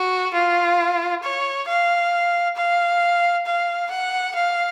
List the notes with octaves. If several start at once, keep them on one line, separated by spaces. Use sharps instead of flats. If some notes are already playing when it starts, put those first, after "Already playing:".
Already playing: F#4
F4
C#5
F5
F5
F5
F#5
F5